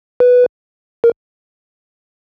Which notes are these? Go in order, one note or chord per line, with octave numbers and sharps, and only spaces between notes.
B4
A#4